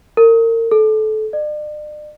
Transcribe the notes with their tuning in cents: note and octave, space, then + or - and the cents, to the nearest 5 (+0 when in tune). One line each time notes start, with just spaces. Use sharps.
A#4 -35
A4 -25
D5 +40